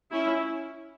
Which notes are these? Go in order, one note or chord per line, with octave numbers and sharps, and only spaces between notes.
C#4 E4